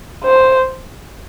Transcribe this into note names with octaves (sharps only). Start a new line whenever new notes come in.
C5